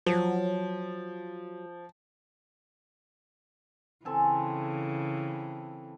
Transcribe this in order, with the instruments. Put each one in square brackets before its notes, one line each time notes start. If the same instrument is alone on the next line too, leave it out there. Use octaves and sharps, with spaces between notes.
[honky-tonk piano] F3 [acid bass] F#3
[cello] C#3 E3 [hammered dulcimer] C4 A4 G#5